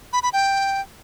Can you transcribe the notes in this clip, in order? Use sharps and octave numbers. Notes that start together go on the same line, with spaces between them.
B5
B5
G5